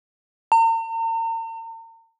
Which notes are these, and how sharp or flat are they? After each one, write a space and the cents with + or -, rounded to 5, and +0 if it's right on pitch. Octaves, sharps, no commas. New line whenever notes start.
A#5 -45